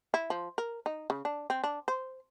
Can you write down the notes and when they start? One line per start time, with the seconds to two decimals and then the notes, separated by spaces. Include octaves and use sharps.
0.14 E4
0.30 F3
0.58 A#4
0.86 D#4
1.10 C#3
1.25 D4
1.50 C4
1.64 D4
1.88 C5